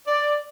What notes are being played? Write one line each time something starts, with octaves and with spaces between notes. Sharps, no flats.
D5